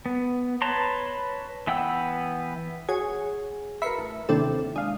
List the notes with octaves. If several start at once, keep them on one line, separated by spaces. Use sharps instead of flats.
B3
B4 C#5 A5 A#5 C6
E3 B3 F#5 G5 E6
F#4 G#4 C#5 G#5
A#4 B4 E5 B5 C7 C#7
A1
D#2 C3 C4 D4 E4 A4
G#3 D4 F5